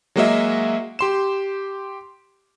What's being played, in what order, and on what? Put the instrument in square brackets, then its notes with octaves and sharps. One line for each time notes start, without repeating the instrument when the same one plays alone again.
[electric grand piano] F#3 G#3 A#3 F#4 D#5 E5
G4 C6 E7